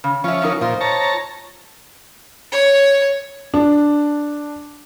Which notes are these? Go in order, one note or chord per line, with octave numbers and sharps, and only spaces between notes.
C#3
F3 C#4 C#5 E5
F#3 D#4 A#4
A#2 D#4 F4 C5
C#5 A5 A#5
C#5
D4